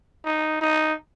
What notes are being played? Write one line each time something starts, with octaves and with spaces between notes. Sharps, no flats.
D#4
D#4